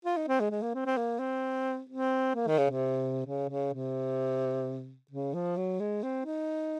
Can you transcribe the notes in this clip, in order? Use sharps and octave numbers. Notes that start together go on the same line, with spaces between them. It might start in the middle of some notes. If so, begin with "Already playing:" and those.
F4
D#4
C4
G#3
G#3
A#3
C4
C4
A#3
C4
C4
A#3
D#3
C#3
C3
C#3
C#3
C3
C#3
F3
F#3
G#3
C4
D#4